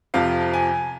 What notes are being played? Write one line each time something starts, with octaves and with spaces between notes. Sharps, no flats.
F2 C3 F3 F5
G#5